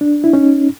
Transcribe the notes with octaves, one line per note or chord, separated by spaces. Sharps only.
D4
E4
C#4 D#4